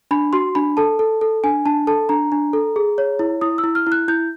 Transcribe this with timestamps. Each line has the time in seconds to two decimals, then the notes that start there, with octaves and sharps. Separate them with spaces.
0.11 D4 B5
0.33 F#4 C6
0.55 D4 B5
0.77 A4 A5
0.99 A4
1.21 A4
1.44 D4 G#5
1.66 D4 A5
1.87 A4 A5
2.09 D4 A#5
2.32 D4
2.53 A4
2.76 G#4
2.98 C#5
3.19 E4
3.41 E4 D#6
3.58 E6
3.64 E4
3.75 F6
3.87 E4
3.92 F#6
4.08 E4 G6